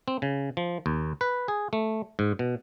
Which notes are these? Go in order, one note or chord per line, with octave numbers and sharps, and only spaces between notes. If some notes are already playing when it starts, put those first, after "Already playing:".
C4
C#3
F3
D#2
B4
G#4
A3
G#2
B2